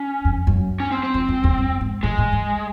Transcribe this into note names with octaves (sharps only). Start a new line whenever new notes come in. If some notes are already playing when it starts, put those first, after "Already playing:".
Already playing: C#4
F2
F#2
C#4
C4
C4
F2
F2
E2
F#2
G#2
A2 G#3
A2
G#2